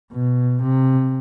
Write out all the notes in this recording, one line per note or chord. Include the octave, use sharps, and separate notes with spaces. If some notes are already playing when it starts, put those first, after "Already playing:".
B2
C3